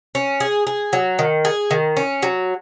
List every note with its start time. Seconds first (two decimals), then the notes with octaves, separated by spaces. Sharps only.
0.15 C#4
0.40 G#4
0.67 G#4
0.93 F#3
1.19 D#3
1.45 G#4
1.71 D#3
1.97 C#4
2.23 F#3